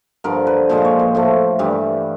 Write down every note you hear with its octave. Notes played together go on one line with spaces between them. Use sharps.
G2 D3 F3 A#4
B4
A#2 F3 G#3 C5
C#5
C5
A2 F3 A3
G2 E3 G3